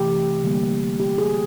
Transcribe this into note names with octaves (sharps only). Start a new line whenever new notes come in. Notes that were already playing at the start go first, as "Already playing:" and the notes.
Already playing: C3 E3 A3 G4
D3 G3 A#3
G4
G#4